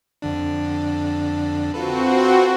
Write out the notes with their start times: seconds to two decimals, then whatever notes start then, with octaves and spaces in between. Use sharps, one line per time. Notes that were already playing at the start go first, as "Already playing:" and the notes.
0.22 F2 D3 D4
1.74 C4 F4 F#4 A4 B4